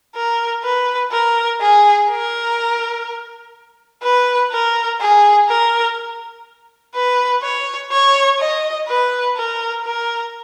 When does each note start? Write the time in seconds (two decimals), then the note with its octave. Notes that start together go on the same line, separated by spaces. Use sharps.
0.15 A#4
0.64 B4
1.12 A#4
1.61 G#4
2.10 A#4
4.03 B4
4.52 A#4
5.00 G#4
5.49 A#4
6.95 B4
7.43 C#5
7.91 C#5
8.39 D#5
8.88 B4
9.37 A#4
9.85 A#4